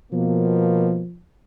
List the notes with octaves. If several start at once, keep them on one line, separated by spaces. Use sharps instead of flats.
B2 F3 A#3